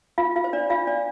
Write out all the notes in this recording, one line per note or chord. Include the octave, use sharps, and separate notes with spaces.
F4 F5
F4 F5
C5
D4 D5
F4 F5
D4 D5